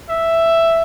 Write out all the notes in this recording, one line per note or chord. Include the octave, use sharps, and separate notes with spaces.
E5